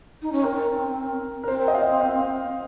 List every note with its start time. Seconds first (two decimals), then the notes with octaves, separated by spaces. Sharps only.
0.22 D#4
0.32 C#4
0.43 C4 A#4
1.43 A#4
1.48 C4 C5
1.68 D#5
1.75 F5
2.01 F5